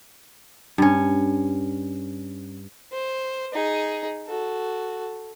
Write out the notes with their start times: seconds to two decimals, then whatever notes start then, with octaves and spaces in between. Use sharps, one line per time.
0.78 G2 C#4
2.92 C5
3.53 D#4 G#4
4.27 F#4 A4